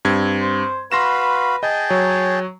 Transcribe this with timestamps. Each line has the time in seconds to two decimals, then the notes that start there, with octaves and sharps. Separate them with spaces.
0.05 G2 C4 G#6
0.41 C5
0.92 F#4 B4 F5 B5 C6 A#6 E7
1.63 G#4 D#5 G5 A5
1.90 F#3 C#5